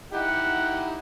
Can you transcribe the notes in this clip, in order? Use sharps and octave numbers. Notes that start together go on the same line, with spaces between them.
D#4 E4 G4 F#5